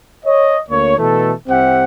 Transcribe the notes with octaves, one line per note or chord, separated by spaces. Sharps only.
C#5 D#5
D2 A#3 C#5
B2 E3 A3 A4
C2 C4 G4 E5 F#5